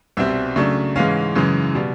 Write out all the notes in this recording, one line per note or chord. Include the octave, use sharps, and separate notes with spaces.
C2 B2 G3 C4 E5
C#3 F#3 A3 D4
G#2 E3 G#3 C#4 F5
F#2 C#3 E3 G#3
B2 G3